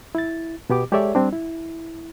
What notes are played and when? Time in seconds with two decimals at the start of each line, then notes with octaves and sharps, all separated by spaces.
0.15 E4 A6
0.70 B2 B3 G4 D6
0.92 G#3 G4 A4 C#5 D5 E5
1.15 G3 C4 D4
1.33 E4